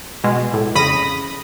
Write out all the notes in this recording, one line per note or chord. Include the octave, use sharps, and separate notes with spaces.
B2 G#3
A2
F2 C#3 B5 D#6 A#6